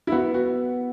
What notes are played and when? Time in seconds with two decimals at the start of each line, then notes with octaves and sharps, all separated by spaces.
0.07 E4
0.12 B3 F#4
0.34 F#4